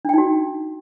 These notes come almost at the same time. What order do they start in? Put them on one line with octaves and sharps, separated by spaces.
D4 G5 D#4 F#4